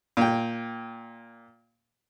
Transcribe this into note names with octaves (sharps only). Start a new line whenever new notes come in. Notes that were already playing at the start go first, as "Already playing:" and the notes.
A#2 G5